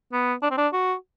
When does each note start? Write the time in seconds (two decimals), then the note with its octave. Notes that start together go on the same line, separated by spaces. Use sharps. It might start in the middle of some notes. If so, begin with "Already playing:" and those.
0.12 B3
0.42 D4
0.51 C4
0.57 D4
0.73 F#4